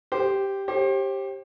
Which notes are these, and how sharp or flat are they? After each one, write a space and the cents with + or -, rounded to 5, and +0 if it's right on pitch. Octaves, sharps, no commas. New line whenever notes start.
G4 +0 C5 +0
G4 +0 C5 +40